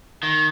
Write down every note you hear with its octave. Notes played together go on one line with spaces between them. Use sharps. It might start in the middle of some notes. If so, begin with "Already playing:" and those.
D#3